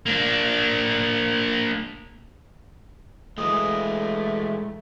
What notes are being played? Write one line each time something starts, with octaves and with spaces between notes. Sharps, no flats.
A#3 D4
E3 G#3 A3 D#6